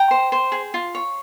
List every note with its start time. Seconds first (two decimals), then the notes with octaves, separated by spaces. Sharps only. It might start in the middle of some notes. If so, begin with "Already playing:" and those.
Already playing: G5 A#5
0.11 C5
0.32 C5
0.52 G#4
0.74 F4
0.95 C#5